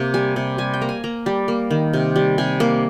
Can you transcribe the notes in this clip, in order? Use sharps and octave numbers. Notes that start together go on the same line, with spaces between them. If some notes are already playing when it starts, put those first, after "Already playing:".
Already playing: C3 A#3
G3 G#5
C3
G3 G#5
G5
A#3 A#5
G#5
A#3 A#5
G3
A#3
D#3
C3
G3
C3 G#5
A#3